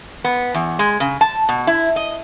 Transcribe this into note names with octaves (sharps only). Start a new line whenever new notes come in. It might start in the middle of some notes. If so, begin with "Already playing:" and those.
B3
E2
G#3
C#3
A5
B2
E4
D#5